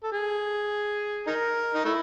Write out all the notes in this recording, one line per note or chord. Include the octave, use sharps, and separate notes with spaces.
A4
G#4
D#4 A#4
D#4
A3 E4